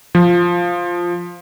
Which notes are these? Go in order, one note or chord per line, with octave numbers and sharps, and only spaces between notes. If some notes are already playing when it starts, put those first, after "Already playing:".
F3